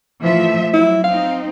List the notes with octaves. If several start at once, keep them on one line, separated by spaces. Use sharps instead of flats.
E3 F3 A3 E5
F#3 E4
C4 D#4 F5